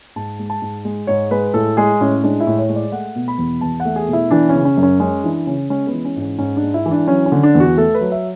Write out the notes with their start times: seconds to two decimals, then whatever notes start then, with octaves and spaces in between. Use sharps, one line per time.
0.16 G#2 A5
0.39 G#3
0.50 A5
0.62 G#2
0.85 G#3
1.07 G#2 C#5
1.31 G#3 B4
1.54 A2 A4
1.77 G#3 G#4
2.00 A2 C#4
2.23 G#3 D4
2.40 E4
2.47 A2
2.58 C#5
2.69 G#3
2.76 D5
2.92 A3 F#5
3.15 B2
3.28 B5
3.38 E2
3.61 E2 A5
3.80 F#5
3.85 A3
3.96 G#4
4.08 B2
4.13 E4
4.31 E3 D4
4.49 C#4
4.55 C#3
4.65 C#4
4.77 F#2
4.83 C#4
5.00 G#3 C#4
5.24 E3 D4
5.47 C#3 C#4
5.70 G#3 C#4
5.87 B3
5.93 E3
6.05 C#4
6.16 G#2
6.22 C#4
6.39 G#2 C#4
6.57 D4
6.63 G#3
6.74 E4
6.86 E3
6.91 D4
7.08 F#3 C#4
7.26 C#4
7.32 D3
7.43 D4
7.55 E2
7.60 F#4
7.77 A3 A4
7.95 B4
8.01 F#3
8.12 E5